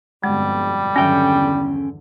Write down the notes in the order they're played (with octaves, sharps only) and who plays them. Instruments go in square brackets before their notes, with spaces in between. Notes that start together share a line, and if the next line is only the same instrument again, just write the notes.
[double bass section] G1 F2 B2 [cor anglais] G3 [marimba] G#3
[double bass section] E2 D3 [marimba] G2 D#3 F#3 [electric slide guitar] C#4 G5